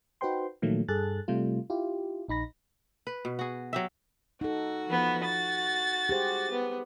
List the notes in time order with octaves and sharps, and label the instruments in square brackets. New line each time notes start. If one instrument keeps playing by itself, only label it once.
[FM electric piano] D#4 F#4 B4 C5 G5 C6
A#2 D#3 F3 F#3 A3 A#3
G2 G#4 A4 F#6 A6
C3 G3 A3 F4
E4 F4 G4
A#1 D#4 B5 A#6
[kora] B4
B2
F#4 G#4
F#3 G4 E5
[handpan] D#4 A4 [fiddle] F#4
[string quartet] F3 B3
A6
[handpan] G4 G#4 C5
[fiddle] B3